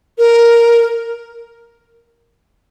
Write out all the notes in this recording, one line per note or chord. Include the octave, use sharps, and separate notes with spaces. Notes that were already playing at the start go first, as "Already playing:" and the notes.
A#4